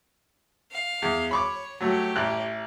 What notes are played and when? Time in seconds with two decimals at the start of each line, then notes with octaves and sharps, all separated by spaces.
0.72 F5
1.02 E2
1.31 C#5 B5 C#6 D6
1.81 F#3 A3 G4 C#5
2.16 A1 F#6